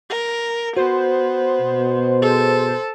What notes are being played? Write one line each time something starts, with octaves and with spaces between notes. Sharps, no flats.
A#4
B3 F#4 C5
B2
G#4 A4